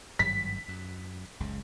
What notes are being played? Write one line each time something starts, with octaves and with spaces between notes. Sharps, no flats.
G#1 G2 F#3 B6
F#2
F#1 C#2 C#3